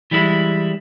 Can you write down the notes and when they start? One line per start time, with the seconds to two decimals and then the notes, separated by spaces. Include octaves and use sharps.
0.11 E3 G3 G#3 E4